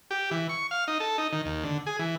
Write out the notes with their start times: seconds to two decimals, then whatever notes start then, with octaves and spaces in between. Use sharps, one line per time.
0.11 G4
0.31 E3
0.49 C#6
0.71 F5
0.88 D#4
1.00 A4
1.18 D#4
1.32 D#3
1.46 D#2
1.64 D3
1.86 G#4
1.99 E3